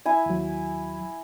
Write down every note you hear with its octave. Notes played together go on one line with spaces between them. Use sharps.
E4 G#5
D#2 F#3